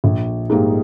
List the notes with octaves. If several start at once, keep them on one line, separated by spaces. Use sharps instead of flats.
A#1
G#2 G3 A#3 D#4